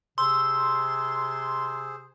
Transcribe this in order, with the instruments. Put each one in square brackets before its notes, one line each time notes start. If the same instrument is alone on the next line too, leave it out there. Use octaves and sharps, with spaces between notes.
[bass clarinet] C3 [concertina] G#4 C5 [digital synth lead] C6 [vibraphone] E6